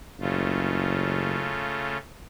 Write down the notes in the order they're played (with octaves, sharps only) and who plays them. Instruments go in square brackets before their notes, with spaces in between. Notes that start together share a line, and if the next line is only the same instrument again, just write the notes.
[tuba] F#1 [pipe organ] C#3 A3 F4